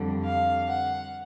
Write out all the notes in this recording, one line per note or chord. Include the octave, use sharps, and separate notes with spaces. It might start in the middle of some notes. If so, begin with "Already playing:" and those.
Already playing: F2 D3 G3
F5
F#5